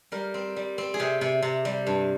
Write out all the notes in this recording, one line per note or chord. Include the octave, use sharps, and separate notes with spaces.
G3 A#4
C4
G3
C4
G#4
C3 G4
C3
C3
G3
G2